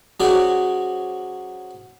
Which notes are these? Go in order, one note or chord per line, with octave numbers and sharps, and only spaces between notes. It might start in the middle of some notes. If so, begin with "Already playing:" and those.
F#3 C#4 F#4 G#4 C5 D5